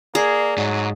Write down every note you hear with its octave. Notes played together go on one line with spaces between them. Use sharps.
A#3 G#4 D5
G#2 F#3